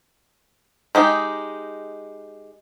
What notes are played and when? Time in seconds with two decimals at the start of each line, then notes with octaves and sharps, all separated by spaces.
0.95 G#3 D#4 G4